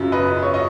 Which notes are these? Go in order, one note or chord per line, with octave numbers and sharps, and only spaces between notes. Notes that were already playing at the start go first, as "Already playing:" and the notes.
Already playing: F#2 C#3 F#3 F4
B4 D#5
C#5
D#5